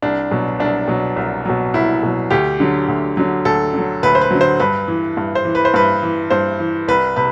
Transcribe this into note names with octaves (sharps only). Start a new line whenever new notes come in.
C2 D4
B2 F#3
C2 D4
B2 F#3
C2
B2 F#3
C2 E4
B2 F#3
D2 G4
D3 F#3
D2
D3 F#3
D2 A4
D3 F#3
D2 B4
C5
B4
D3 F#3
C5
G2 B4
E3
G2
C5
E3
B4
C5
G2 B4
E3
G2 C5
E3
C2 B4
C3 B4